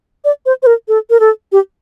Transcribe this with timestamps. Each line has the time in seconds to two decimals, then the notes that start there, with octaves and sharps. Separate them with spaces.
0.25 D5
0.46 C5
0.63 C5
0.67 A#4
0.88 A4
1.10 A#4
1.20 A4
1.52 G4